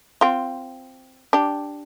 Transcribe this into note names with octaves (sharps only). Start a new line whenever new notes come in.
C4 F4
D4 G4